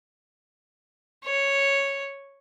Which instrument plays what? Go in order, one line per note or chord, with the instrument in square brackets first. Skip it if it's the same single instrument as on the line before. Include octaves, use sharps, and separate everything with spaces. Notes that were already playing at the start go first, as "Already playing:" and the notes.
[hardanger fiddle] C#5